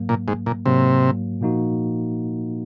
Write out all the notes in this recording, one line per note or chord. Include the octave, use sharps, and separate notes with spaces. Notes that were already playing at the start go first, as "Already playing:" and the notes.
Already playing: G#2 F#3 A#3
A#2
G#2
A#2
G#2 C3 F#3 A#3
A#2 F3 A#3 D#4 F#4